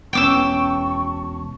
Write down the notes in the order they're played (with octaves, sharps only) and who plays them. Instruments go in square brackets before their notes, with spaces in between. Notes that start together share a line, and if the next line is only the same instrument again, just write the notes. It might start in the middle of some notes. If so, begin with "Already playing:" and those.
[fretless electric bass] E1 B3 C#4 [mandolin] G5 D6 E6 [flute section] A5 C#6